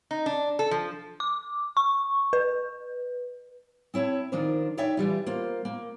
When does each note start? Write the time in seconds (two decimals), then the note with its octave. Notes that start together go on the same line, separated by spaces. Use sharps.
0.11 D#4
0.26 D4
0.59 A4
0.71 F3
1.20 D6
1.77 C#6
2.33 B4
3.94 C4 E4 C#5 A5
4.32 D#3 F3 D4 A#4 C5
4.77 D#4 C#5 D5 E5 G5
4.97 E3 G3 F4
5.26 A#3 F4 C5
5.65 A#3